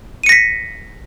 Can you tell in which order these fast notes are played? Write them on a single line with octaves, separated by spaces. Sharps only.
D#7 C#7 A#6 B6